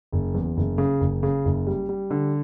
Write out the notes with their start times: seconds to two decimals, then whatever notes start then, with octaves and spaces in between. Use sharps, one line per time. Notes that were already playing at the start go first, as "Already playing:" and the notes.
0.12 F#1
0.34 E2
0.57 F#1
0.78 C#3
1.00 F#1
1.23 C#3
1.45 F#1
1.67 G3
1.89 G3
2.11 D3